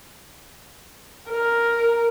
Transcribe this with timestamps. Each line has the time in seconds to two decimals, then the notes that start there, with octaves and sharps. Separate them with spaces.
1.30 A#4